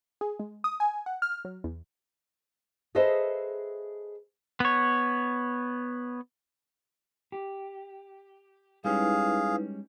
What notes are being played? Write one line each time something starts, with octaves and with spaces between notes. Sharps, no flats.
G#4
G#3
D#6
G#5
F#5
F6
F#3
E2
G#4 A4 B4 C5 D#5 E5
B3 C#5
G4
G3 G#3 C#4 D#4 E4 G#4 B4 F5